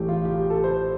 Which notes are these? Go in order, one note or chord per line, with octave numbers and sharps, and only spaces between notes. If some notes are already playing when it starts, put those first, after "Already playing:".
Already playing: A1 A2 G4 A4
F4
G4
G4
A4
C5